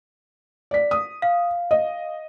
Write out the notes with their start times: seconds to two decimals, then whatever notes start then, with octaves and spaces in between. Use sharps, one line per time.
0.71 D5 B6
0.91 D#6
1.22 F5
1.71 D#5